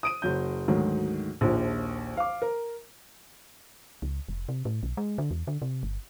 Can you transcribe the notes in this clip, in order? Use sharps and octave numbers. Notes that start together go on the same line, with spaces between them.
D#6 D7 D#7
F#1 F#3 G6
D2 G#2 D#3 F#3
A#1 D#2 F3
F5 D6
A#4
C#2
F1
C3
A2
B1
G#3
D3
E2
D3
C3
G1